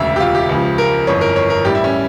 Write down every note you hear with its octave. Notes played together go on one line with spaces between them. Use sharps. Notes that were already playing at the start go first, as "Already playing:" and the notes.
Already playing: E1 D2 C#3 E5
G4
F4
G4
C#2 C#3 F3
A#4
G1 F2 E3 C#5
A#4
C#5
A#4
A1 A2 G3 G4
E4
C#4